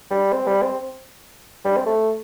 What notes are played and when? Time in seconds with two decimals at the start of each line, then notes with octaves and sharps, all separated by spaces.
0.10 G3
0.33 C4
0.47 G3
0.62 C4
1.65 G3
1.77 C4
1.86 A3